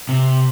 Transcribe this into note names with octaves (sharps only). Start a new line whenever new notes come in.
C3